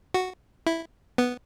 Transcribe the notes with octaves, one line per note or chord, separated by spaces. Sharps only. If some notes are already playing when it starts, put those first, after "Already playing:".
F#4
E4
B3